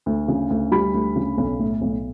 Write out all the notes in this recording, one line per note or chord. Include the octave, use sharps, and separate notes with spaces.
D2
C#3
D2
G3 B5
D2
C#3
B1
A2
B1